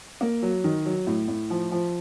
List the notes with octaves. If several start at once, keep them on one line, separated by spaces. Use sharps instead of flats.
A#3
F#3
D#3
F#3
A2
A2
F3
F3